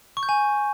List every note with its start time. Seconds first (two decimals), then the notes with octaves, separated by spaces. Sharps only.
0.17 C#6
0.23 G6
0.29 G#5